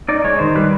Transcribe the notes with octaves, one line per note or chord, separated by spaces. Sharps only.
D#4 D5
G#3 C#5
D#3 C5
G3 B4